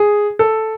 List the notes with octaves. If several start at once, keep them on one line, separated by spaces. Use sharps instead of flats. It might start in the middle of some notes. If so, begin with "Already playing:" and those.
Already playing: G#4
A4